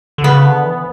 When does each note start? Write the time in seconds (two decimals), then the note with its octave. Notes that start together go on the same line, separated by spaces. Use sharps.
0.18 D3
0.23 C#3 B3
0.44 D3
0.64 E3